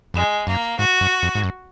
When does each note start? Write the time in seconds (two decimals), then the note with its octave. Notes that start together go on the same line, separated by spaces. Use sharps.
0.14 F2 G#3
0.47 F#2 A#3
0.78 G#2 F#4
1.01 F#2
1.22 F2
1.35 G#2
1.43 F#2